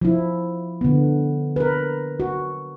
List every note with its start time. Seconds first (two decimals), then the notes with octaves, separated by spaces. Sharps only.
0.01 F3 E4
0.81 D3 B3
1.56 A#4 B4
2.20 F#4